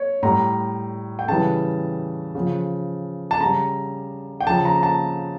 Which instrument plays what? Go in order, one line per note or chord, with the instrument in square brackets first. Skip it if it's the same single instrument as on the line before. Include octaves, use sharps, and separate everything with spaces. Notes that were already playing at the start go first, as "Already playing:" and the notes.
Already playing: [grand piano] C#5
A2 G3 A#5
G5
C#3 E3 G3 A5
C#3 F3
A5
C#3 G3 A#5
G5
C#3 F3 A5
A#5
A5